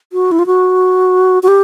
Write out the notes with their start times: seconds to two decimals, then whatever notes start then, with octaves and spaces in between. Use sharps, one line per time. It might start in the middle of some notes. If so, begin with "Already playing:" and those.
0.13 F#4
0.32 E4
0.39 F4
0.47 F#4
1.43 F#4
1.48 G4